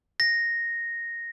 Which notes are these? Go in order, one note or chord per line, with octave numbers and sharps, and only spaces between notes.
A#6